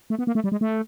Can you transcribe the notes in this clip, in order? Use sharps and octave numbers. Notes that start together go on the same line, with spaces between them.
A3
B3
A#3
A3
G3
G#3
A3